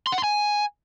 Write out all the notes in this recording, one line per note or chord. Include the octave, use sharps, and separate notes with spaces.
C6
F#5
C6
G#5